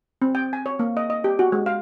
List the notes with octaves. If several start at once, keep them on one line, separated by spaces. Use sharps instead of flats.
C4
G5
G#5
C#5
A#3
D#5
D#5
G4
F#4
G#3
F5